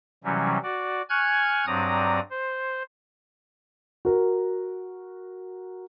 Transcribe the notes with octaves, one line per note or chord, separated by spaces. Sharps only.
C3 E3 F#3 G3 C#4
F#4 D5
G#5 C#6 F6 F#6 G#6
G2 F#3 C4 D5 A#5 D#6
C5
F#4 A#4